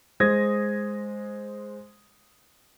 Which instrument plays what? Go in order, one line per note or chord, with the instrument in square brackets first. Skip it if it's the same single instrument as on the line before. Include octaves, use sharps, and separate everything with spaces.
[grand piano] G#3 C5 D#6 G#6 A#6